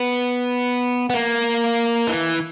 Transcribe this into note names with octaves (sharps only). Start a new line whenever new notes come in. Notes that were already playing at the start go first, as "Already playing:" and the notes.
Already playing: B3
B3
A#3
E3